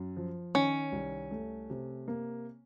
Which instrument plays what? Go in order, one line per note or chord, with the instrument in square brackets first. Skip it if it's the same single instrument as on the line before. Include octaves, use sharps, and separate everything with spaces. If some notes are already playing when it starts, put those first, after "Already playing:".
Already playing: [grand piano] F#2
F3
[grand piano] D#3 [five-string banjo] C#4
[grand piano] C2
A3
C3
A#3